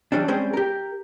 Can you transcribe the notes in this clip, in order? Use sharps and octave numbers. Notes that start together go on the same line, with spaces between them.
E3 F#3 G3 C#4 D4
G3 G#3 C4 C#4 G#4
G4 A#4